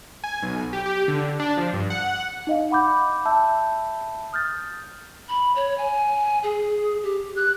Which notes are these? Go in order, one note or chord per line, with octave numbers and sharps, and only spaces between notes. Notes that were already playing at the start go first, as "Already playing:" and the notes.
G#5
B1
G4
G4
D3
D4
F3
G2
F#5
D#4 D#5 F5
F#5 B5 D6 G6
E5 A5 B5 E6 G6
D#6 F6 G6 A6
B5
C#5
G#5
G#4
G4
F#6